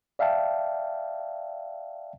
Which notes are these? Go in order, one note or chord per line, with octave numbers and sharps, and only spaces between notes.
D5 E5 F5 G5 A5